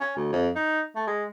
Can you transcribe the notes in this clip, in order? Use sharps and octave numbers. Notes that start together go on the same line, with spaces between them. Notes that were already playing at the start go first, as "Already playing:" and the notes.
C#4
D2
F2
D#4
A3
G#3